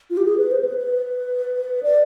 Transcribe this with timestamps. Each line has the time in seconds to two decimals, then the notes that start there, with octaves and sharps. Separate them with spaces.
0.10 F4
0.17 G4
0.25 G#4
0.38 B4
0.51 C5
0.65 B4
0.78 B4
1.83 D5